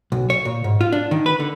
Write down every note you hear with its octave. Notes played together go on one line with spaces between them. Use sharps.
B1
C#5
A#2
G#2
F4
D4
D#3
B4
D3